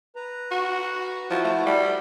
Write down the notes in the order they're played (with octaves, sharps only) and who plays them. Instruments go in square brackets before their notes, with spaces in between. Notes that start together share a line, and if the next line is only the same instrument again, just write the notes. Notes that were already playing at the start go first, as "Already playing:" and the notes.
[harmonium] B4 A#5
[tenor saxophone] F#4
[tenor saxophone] F3 [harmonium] E4 F#4
[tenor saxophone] A3
G3